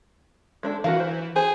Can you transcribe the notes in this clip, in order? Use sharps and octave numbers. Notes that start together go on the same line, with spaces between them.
G#3 D4 A4
E3 F#4 A#4 F5
C5
G#4 C5